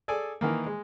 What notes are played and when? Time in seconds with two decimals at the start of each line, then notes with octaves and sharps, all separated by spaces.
0.08 G#4 A4 D5 G#5
0.41 D#3 E3 A#3
0.66 G#3